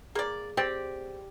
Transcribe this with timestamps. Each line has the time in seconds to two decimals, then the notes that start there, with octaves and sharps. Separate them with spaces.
0.15 A#3 G#4 D5
0.57 C4 G4 D5